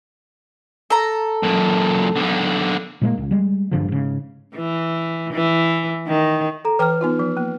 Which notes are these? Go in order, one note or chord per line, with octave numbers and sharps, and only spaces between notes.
A4 A#5
F#2 A#2
B1 D3
A#2 G#3 A#3
C#2
G3 G#3
G#1 G2 D3 F3
G#2 C#3
E3
E3
D#3
A4 A#5
E3 B4 G5 A#5 F6
B3 D#4 F4
F3
A#3